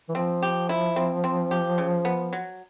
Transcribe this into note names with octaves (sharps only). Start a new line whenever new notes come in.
E3
F3 C4
G4
E4
C4
C4
G4
C#3
B3
F#3